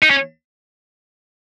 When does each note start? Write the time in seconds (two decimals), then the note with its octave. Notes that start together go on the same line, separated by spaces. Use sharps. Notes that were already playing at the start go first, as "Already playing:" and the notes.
0.03 D#4
0.11 C#4